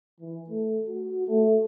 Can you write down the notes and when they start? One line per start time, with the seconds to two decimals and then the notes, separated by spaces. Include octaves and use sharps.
0.20 E3
0.50 A3
0.88 F#4
1.28 A3